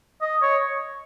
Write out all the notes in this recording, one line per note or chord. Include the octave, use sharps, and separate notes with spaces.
D#5
C#5